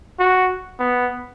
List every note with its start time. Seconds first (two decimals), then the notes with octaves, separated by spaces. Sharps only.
0.19 F#4
0.80 B3